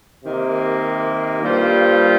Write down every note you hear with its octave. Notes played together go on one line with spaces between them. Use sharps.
C3 D#3 A#3
G2 G3 A#3 F4 C5